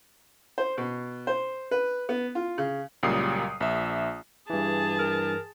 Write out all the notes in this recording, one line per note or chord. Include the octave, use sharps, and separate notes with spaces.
C5
B2
C5
B4
B3
F4
C#3
C#2 A#2 F#3 G3 D#6 C7
A#1 E5
G2 E3 G#4 A5
A#4